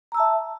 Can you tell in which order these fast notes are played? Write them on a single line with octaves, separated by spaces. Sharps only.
A#5 E6 A5 E5